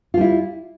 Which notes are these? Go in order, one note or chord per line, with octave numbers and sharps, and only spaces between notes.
G3 E4 F4